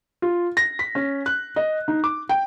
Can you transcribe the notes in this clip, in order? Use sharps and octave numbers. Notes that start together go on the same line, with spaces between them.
F4
A#6
B6
C#4
F#6
D#5
D#4
D6
G5